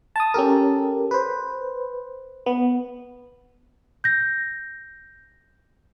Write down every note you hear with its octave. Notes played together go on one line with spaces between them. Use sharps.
A5 D#6
C#4 G4 A4 A#4
B4 C5
B3
G6 A#6